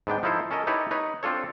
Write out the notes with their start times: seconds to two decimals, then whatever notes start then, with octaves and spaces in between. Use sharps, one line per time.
0.07 G#2 B3 D4 G5
0.23 F3 D#4 E4 A4 C5
0.51 C#4 A4 A#4 D#5
0.67 D#4 E4 G4 B4 C#5 A5
0.91 D#4 B4 C#5
1.23 C4 D4 F4 A4 C#5